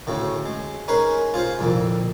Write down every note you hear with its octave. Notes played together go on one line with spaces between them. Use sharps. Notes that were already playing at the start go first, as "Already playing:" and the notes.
D2 A2 C#3
G#3
C#4 D#4 G#4 A#4 B4 C6
F4 G#4 C5 F5
C2 F2 A#2 D3